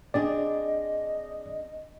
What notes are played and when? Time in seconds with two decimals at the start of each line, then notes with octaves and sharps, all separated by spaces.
0.14 C4 D4 G#4 D5 D#5